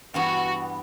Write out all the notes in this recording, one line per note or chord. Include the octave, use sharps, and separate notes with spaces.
G2 E3 B3 F#4